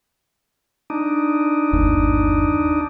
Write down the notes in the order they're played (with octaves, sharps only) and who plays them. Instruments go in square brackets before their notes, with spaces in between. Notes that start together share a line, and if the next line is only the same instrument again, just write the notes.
[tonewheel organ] D4 D#4
[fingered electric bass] G1 D#2